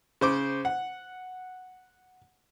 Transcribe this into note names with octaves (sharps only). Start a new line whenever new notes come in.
C#3 C5 D6
F#5